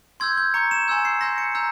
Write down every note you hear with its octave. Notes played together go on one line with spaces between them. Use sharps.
C6 E6 G6 G#6
G6
A#5 C#6 G6 C#7
E7
G#5 C6 E6 G6
C7
C6 E6 G6 A#6
C#7
A#5 E6 G6